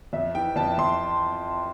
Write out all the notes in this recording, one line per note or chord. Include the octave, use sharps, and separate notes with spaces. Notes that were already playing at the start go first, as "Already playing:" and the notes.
F2 E5
E3 G5
F2 A5
F2 C6